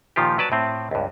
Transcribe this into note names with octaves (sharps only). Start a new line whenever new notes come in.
A#2 D#3 F3 F4 G4
F#3 B4 D5 A5
A2 C4
C#2 G2